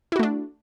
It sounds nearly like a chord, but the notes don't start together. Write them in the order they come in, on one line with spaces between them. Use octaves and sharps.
E4 F#4 A3 D4